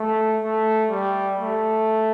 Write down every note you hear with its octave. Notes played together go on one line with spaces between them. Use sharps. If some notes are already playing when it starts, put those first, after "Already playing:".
Already playing: A3
A3
G3
A3